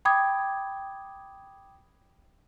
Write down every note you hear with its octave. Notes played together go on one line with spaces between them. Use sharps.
G5 B5 D6 D#6 G#6